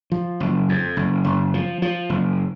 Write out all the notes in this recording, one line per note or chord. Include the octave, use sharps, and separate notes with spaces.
F3
F#1
F2
F#1
F#1
F3
F3
F#1